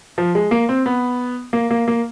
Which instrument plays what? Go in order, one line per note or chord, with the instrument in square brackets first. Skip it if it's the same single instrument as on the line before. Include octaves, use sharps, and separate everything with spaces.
[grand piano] F3
G#3
A#3
C4
B3
A#3
A#3
A#3